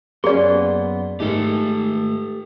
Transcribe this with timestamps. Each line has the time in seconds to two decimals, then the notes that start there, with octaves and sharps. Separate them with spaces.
0.24 F#2 A#3 B3 C#4 G#4 D5 C6
1.20 G#2 D#3 G#3 A3 G4 A4